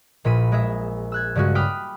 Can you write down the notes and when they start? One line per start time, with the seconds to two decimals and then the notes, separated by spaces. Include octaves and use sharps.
0.24 A#1 A#2 B5 D#7
0.52 G#3 G#4 E5
1.12 E6 F#6 G#6
1.35 G2 C#3 G#3 C#4 F#4
1.55 G5 B5 D6 D#6 F6 F#6